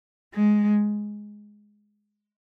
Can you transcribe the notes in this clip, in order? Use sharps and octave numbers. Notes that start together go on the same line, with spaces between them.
G#3